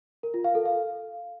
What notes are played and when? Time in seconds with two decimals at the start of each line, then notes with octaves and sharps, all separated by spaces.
0.23 A#4
0.34 F4
0.44 F5
0.55 A4
0.66 F5